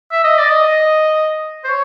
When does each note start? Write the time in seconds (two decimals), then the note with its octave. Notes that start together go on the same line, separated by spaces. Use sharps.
0.12 E5
0.24 D#5
0.38 D5
0.49 D#5
1.64 C5
1.68 C#5